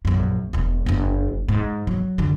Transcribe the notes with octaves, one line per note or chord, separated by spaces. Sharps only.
A#1 F#2
E1 E2
F#1 D4
G#2
F#3
F#2 D3